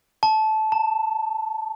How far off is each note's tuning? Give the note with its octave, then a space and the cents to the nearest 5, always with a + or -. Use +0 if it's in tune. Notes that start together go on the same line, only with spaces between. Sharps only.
A5 -15
A5 +35